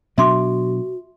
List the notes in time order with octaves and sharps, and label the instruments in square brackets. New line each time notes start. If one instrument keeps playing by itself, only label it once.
[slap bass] B2 F#3 D4 [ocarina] F#4 [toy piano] E5 C6 D6